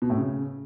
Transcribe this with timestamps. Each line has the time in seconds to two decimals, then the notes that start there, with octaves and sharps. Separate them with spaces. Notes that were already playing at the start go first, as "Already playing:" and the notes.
0.02 B2
0.10 A2
0.18 C#3